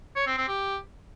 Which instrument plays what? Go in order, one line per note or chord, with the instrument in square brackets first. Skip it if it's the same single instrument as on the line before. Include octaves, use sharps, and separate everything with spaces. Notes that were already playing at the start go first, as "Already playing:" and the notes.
[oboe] C#5
C4
C4
G4